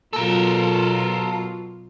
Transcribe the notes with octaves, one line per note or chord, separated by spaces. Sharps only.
B2 F#3 F4 A4 A#4